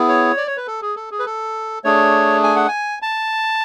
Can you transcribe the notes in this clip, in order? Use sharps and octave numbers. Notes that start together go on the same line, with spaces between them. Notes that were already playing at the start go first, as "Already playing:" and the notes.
Already playing: B3 E4 G#4
C#5
D5
C#5
B4
A4
G#4
A4
G#4
B4
A4
A3 D4 G#4 C#5
G#5
F#5
G#5
A5